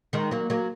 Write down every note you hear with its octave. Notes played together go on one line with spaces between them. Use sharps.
D#3 G#3
F#3 A#3
F#3 A#3